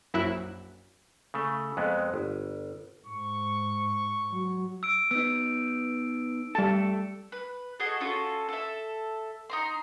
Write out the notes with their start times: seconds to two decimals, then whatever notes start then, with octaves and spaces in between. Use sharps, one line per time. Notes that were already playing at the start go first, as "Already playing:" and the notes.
0.14 A#1 F#2 E4 E5 F#6 D7
1.34 C#3 A3
1.77 F2 G#3 B3
2.14 G1
3.07 G#2 C#6
4.31 F#3
4.83 E6 D7
5.11 B3 D#4 E6
6.55 G3 A3 A4 A5
7.32 B4
7.80 F#4 G#4 A4 D#5
8.00 C#4 F4 F#4 A4
8.49 A4 E5
9.50 D#4 A#5 C6